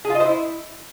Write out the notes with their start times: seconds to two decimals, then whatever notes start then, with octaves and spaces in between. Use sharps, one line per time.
0.05 G#4
0.10 F4
0.15 D#5
0.20 C5
0.25 E4